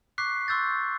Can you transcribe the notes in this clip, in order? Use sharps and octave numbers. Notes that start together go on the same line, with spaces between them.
C#6 D6 F#6 B6 C7
C6 C#6 E6 G6 A6